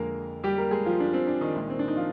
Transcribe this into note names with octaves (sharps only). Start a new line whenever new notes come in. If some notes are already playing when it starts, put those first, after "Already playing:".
Already playing: F2 D3 G#3 A#3 A#4
G3 G4
A#3 A#4
G#3 G#4
F3 F4
D4
C4
D4
D#3 D#4
C2 A#2 G#3
C4
D4
D#4
F3 F4